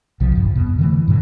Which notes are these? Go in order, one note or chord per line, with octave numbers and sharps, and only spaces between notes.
B1 C#3 F3
D#1 G2
F2 B2
D3 E3 A3
G2 A#2 D3 F#3